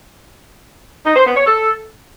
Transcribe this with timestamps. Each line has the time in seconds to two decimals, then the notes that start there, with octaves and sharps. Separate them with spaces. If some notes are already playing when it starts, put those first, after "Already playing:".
1.06 D#4
1.16 C5
1.26 B3
1.36 C#5
1.46 A4